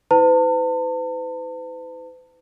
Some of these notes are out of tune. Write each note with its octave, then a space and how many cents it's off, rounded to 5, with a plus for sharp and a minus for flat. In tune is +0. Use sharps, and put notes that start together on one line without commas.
E4 -35 B4 +45 A5 +35